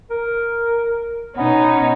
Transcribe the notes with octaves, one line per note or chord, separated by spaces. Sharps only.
A#4
B2 B3 C#4 D#4